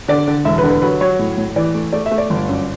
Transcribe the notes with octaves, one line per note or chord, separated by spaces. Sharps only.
D3 D5
D3
E1 E5
B4
D3
B4
F#3 B4
F#3 C#5
A2
A2
E3 D5
A3
A3 D5
E5
A3
D5
G1
F#2